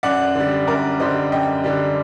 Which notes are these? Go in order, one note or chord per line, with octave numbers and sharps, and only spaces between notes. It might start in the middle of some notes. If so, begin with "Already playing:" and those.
F#2 D5 F#5
D3 G3
F#2 A#4 D5
D3 G3 C5 D#5
F#2 D#5 G5
D3 G3